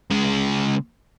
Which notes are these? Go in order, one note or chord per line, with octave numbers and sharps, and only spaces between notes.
C#3 G#3